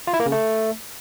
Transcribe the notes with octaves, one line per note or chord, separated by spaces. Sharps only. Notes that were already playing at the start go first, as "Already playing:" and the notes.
F4
E4
A#3
C#3
A3